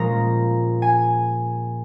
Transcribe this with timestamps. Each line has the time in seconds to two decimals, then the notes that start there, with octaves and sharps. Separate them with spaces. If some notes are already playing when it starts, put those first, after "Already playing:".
Already playing: A#2 F3 G#3 C#4 A#5
0.82 G#5